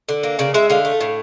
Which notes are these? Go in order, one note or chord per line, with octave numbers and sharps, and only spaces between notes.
D3
A#3
C#3 D5
G#3 E5
D3 F5
A3
A2